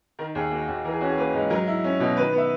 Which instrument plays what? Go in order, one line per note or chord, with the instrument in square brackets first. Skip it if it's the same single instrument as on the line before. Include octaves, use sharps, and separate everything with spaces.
[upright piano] D#3 A#4
D#2 G#4
A#3 F#4
D#2 F#4
E3 A#4
G#4
C#4 F#4
G#4
A#3 B4
G#2
F#3 A#4
E4
C#4
B2
D#3 B4
B3
E5